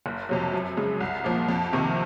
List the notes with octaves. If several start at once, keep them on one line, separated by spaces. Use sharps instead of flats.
F#1
F2 C3 F#3
F#2
C#3 G#3
C2
A#2 F3 A#3
F2
C3 D#3 A#3